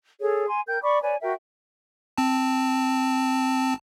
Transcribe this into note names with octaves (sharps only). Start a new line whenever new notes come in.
G#4 A4 C#5
G#5 C6
A#4 G5 G6
D5 B5 C#6 D6
B4 C#5 D5 G#5
F#4 A#4 E5 G5
C4 A5